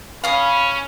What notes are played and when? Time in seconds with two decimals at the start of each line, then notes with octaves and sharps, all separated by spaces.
0.24 C#4 F5 B5 D#6